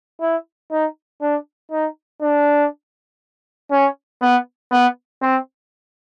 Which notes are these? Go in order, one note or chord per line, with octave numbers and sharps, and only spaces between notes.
E4
D#4
D4
D#4
D4
C#4
B3
B3
C4